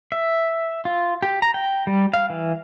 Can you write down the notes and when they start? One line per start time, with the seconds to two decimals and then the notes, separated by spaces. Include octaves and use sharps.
0.12 E5
0.85 F4
1.22 G4
1.42 A#5
1.54 G5
1.87 G3
2.14 F5
2.30 E3